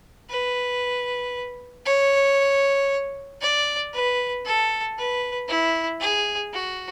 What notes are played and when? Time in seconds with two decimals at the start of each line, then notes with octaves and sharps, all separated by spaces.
0.29 B4
1.86 C#5
3.41 D5
3.93 B4
4.45 A4
4.98 B4
5.49 E4
6.01 G#4
6.53 F#4